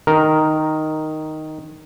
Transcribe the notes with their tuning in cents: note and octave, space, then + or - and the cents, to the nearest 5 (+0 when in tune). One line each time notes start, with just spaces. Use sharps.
D#3 +0 A#4 +0